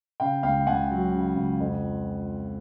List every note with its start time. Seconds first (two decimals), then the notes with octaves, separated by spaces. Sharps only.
0.20 C#3 F5 G5
0.43 C#2 F5 G5
0.67 C#2 F#5 G#5
0.91 F#3
1.13 C#3
1.36 C#2
1.60 F2